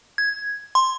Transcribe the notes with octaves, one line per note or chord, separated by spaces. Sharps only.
G#6
C6